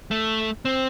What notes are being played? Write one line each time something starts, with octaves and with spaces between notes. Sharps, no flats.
A3
C4